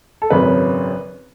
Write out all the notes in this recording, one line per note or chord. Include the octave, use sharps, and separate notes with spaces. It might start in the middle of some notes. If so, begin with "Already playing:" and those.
A4
G#1 F#2 C#3 B4